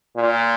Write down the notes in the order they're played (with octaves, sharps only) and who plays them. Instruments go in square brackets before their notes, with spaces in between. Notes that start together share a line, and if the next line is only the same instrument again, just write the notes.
[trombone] A#2